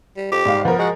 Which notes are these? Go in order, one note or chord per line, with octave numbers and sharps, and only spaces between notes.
G3
F2 G4
G#2 G3 F5
F3 B3 A#4
G#3 F#4